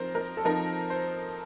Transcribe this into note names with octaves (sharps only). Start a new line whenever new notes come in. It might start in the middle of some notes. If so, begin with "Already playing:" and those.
Already playing: F3 C4 D#4 A#4 C5
A#4
A4
F3 C4 D#4 A#4
C5